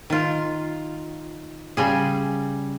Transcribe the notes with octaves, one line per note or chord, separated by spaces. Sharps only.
D#3 F4
C#3 G3 G#4